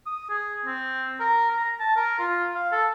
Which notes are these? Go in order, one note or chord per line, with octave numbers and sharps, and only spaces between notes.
D#6
G#4
C4
A#4
A#5
A5
A#4
F4
F5
A4